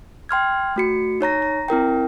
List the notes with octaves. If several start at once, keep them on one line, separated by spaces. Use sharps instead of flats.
G5 C6 F6 G#6
A3 F#4 C#7
D#4 C#5 A#5 A#6
A#5
C4 E4 A#4 G5